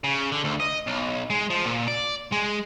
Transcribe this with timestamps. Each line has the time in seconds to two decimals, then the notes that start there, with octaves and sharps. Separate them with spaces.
0.04 C#3
0.32 D3
0.44 D2
0.60 D#5
0.87 B1
1.30 G#3
1.50 F3
1.66 A#2
1.88 D5
2.32 G#3